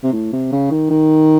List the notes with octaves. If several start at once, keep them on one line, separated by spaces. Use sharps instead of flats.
C3
A2
C3
C#3
D#3
D#3